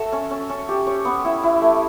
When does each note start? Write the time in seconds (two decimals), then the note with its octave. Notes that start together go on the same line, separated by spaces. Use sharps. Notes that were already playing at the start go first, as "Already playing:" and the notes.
Already playing: F#4 A4 E5
0.12 C#4
0.31 C#4
0.49 C#4
0.69 G4
0.87 C#5
1.05 B3
1.25 E4
1.43 E4
1.62 A3